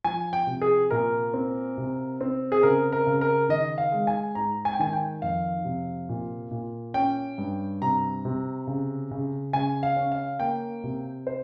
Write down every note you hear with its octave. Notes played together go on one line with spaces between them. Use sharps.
F3 G#5
G5
C3
G#4
A#2 A#4
C4
C3
C4
G#4
C#3 A#4
A#4
C#3
A#4
D#3 D#5
F5
G#3
G#5
G#2 A#5
G#5
G5
D#3 G#5
G5
F2 F5
C3
A#2
A#2
C#4 G5
G2
C3 A#5
C3
C#3
C#3
C#3 G#5
F5
C#4
F5
A#3 G5
C3
C5